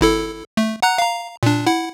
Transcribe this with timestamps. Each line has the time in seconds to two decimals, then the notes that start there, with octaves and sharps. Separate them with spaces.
0.01 G#1 E4 A4
0.57 A3
0.82 F#5 A#5 F#6
0.98 F5 A#5
1.43 A#2 D4
1.67 E4 F#5